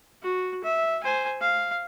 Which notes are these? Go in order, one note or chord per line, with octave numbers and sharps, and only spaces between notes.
F#4
E5
C5 G#5
F5